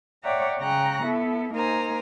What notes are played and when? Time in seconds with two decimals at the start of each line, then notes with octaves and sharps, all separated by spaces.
0.23 C#5 D5 E5 F#5 G5 A#5
0.60 C#3 G5 A#5 C#6 F#6 A#6
1.03 B3 E4 A4
1.52 A#3 D#4 A#4 C5 G#5 A#5